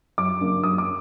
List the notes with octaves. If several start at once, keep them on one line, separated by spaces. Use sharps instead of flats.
F#2 D6
C#3 F#3 A#3 D4
F#2 D#6
D6